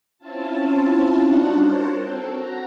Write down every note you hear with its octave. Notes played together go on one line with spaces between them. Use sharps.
C4 C#4 E4 F4 A5
G3 D4 D#4 F4 F#4 F#5
A#4 C5 C#5 A5
C4 A4
F#4 A#5